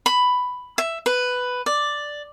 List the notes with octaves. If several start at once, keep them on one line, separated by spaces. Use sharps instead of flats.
B5
E5
B4
D5